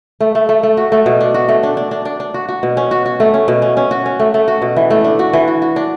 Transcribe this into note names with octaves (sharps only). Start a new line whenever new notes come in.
A3
A3
A3
A3
F#4
A3
B2
D4
F#4
A3
D4
D4
D4
D4
D4
F#4
F#4
B2
C#4
F#4
F#4
A3
C#4
B2
C#4
C#4
F#4
C#4
A3
A3
F#4
B2
E3
A3
D4
F#4
E3
F#4
F#4
D4